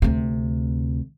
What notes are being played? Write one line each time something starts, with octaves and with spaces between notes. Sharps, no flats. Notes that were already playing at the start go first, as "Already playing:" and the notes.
D2 C3